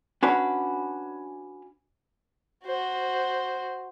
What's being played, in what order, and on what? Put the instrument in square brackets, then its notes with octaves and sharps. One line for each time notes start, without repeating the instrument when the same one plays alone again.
[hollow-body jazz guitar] C#4 D4 F#4 B4
[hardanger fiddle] F#4 C5